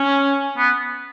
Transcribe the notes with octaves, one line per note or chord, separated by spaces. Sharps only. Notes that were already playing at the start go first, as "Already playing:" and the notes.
Already playing: C#4
B3